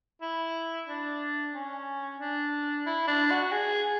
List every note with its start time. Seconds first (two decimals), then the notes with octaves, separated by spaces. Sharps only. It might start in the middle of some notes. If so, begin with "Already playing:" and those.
0.21 E4
0.87 D4
1.53 C#4
2.20 D4
2.86 E4
3.07 D4
3.30 F#4
3.52 G#4